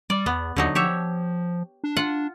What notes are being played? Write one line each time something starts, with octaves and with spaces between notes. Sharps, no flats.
G3 D5
E2 B3
D#2 D3 F#3 D#4
F3 G4 C#5 E5
D4
F4 F#5